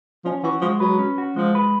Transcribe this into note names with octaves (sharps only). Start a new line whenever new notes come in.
F3 C#4
E3 F#4
F3 G#3
F#3 B4
C#4
F#4
F3 G#3
B4